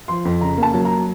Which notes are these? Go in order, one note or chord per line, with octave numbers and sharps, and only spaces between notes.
F3 C6
F2
C#3 A#5
A#3
A5
F#3
A#5